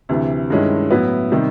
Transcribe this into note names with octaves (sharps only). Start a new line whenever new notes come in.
D2 C3 E3
G2 D#3 G#3 C#4 E4
A2 F#3 B3 E4
C3 D#3 G3